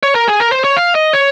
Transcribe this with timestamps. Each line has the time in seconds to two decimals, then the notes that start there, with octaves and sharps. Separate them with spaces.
0.03 C#5
0.15 A#4
0.28 G#4
0.40 A#4
0.52 C5
0.64 C#5
0.76 F5
0.95 D#5
1.13 C#5